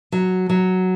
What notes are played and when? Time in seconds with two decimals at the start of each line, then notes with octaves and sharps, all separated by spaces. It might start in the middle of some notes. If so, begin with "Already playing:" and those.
0.12 F#3
0.49 F#3